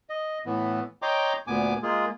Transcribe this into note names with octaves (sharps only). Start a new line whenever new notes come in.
D#5
A2 E3 B3
C#5 D#5 G5 A#5 C6 D6
D2 A#2 B3 G#5 D6
G#3 A#3 F4 G#4